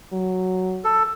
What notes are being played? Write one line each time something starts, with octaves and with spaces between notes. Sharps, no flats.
F#3
A4